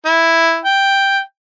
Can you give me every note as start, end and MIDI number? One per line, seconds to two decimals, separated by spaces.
0.05 0.59 64
0.65 1.20 79